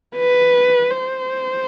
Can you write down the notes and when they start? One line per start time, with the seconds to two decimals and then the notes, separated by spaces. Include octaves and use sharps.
0.16 B4
0.90 C5